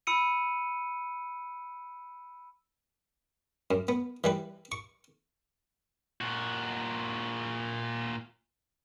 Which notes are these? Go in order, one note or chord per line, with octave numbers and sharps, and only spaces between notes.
B5 E6 C#7 D#7
F#2
B3
E3 G3 B4
C#6
A#2 F#4